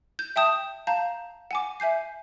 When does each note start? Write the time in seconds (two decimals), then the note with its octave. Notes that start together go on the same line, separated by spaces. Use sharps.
0.19 G6
0.36 E5 G5 A5 D#6 G6 E7
0.87 F5 A5 A#5 G6
1.51 F#5 G#5 D6
1.80 E5 G#5 G6 C7